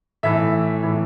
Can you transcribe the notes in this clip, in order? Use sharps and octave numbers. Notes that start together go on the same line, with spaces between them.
A2 E3 E5
A2 E3